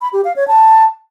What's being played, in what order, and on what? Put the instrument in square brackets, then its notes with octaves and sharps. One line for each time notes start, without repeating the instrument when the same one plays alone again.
[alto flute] B5
G4
F5
C#5
A5